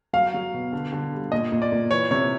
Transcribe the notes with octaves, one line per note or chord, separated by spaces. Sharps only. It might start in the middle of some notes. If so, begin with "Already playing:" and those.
F#3 F5
F#3
B2
D3
D3
G3
A#2 D#5
A#2
D5
A#2
E3 C#5
C3 C#5